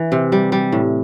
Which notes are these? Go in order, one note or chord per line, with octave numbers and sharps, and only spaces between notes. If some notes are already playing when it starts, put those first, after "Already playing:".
Already playing: E3
C3
G3
G3
A2